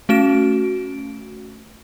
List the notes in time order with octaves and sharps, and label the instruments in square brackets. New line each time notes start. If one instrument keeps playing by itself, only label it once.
[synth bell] A3 C#4 F#4 D7 E7